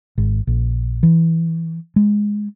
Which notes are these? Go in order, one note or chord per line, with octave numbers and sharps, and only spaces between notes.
G#1
A#1
E3
G#3